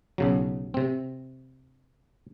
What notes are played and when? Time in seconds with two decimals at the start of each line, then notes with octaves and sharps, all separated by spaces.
0.18 B1 C#3 F#3
0.74 C3 C4